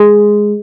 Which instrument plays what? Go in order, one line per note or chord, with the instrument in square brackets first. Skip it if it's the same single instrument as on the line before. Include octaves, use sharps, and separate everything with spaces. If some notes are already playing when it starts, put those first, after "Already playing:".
Already playing: [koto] G#3